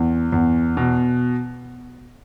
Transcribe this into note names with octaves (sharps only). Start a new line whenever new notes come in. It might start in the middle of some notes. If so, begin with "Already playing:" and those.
Already playing: E2
E2
B2